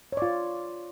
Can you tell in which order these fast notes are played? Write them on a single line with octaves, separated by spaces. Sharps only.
C#5 D5 F4